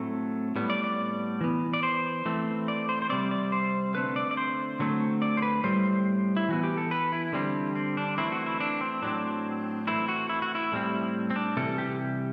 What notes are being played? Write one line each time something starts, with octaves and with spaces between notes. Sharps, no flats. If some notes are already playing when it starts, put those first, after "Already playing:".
Already playing: A2 F#3 A3 C4 A4
A2 G3 B3
D5
D5
E3 B3
D5
C5
E3 A3 C4
D5
C5
C5
C3 G3 C4 D5
D5
C5
D3 A3 C4 B4
D5
D5
C5
D3 F#3 A3 C4
D5
C5
B4
A2 G3 C4 C5
E4
E3 B3 F#4
G4
A4
B4
E4
D3 G3 C4
C4
D4
E3 A3 C4 E4
F#4
E4
D4
C4
A2 F#3 C4 D4
E3 A3 C4 E4
F#4
E4
F#4
E4
A2 G3 C4
C4
D4
C3 E3 G3 A4
G4